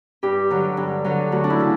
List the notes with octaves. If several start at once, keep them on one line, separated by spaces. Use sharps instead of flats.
G2 G4
D3 F#3
G2
D3 F#3
D2 F#4
D4
E4
C#3 E3